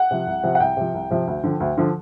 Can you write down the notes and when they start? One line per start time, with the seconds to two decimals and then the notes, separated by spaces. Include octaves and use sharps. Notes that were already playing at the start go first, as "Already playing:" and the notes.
Already playing: F#5
0.11 C3 F3
0.27 C2
0.43 C3 F3
0.55 F#5
0.60 C2 G5
0.77 C3 F3
0.94 C2
1.10 C3 F3
1.27 D2
1.44 D3 F3
1.60 D2
1.78 D3 F3